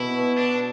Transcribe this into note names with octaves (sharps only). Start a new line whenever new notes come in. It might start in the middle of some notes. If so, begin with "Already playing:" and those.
Already playing: B2 E4
D4